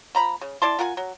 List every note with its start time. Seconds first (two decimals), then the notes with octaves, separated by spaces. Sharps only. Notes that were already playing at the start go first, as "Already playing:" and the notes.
0.15 F3 A#5 B5
0.41 C#3
0.62 E4 D5 A5 C6
0.79 F4 A#4 F#5 G#5
0.97 F#3